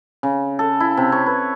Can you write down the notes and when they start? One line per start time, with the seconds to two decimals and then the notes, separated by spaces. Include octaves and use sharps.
0.23 C#3
0.59 A4
0.80 E4
0.97 C3
1.12 C#5
1.26 B4